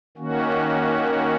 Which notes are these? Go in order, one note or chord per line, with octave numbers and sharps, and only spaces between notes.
D#3 A#3 C#4 F#4